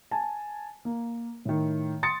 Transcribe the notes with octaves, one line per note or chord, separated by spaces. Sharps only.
G#5 A5
A#3
A2 D#3
C6 D#6 A6 C#7